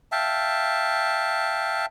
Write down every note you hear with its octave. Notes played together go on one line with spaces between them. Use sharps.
E5 F5 G5 A5